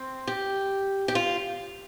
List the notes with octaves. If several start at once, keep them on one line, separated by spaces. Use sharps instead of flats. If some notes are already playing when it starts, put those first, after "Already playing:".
Already playing: C4
G4
G4
F4